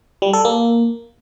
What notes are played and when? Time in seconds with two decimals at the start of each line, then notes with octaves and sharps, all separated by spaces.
0.22 G3
0.33 A4
0.45 A#3